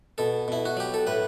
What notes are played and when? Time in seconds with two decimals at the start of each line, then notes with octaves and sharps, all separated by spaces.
0.18 B2 A4
0.48 B2 E4
0.65 F#4
0.77 F#3 G4
0.94 A4
1.07 A2 B4